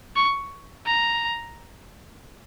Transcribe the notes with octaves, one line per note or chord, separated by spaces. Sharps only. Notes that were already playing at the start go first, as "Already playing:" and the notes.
C#6
A#5